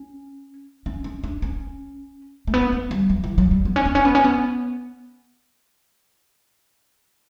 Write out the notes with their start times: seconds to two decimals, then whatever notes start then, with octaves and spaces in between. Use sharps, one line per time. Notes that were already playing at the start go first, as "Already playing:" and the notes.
Already playing: C#4
0.86 C#4
1.04 C#4
1.23 D4
1.42 C#4
2.47 A3
2.54 B3
2.73 A3
2.91 G3
3.10 F#3
3.24 E3
3.38 F#3
3.51 G3
3.65 B3
3.76 C#4
3.86 B3
3.95 C#4
4.05 B3
4.15 C#4
4.24 B3